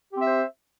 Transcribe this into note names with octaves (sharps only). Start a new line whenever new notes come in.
C4 G4 C5 E5